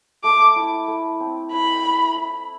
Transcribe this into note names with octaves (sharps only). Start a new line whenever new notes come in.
A3 D6
E4
A3
C4
E4 B5
E5
E4